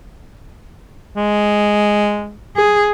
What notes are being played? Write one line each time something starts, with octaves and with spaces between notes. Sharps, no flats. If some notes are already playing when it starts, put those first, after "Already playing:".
G#3
G#4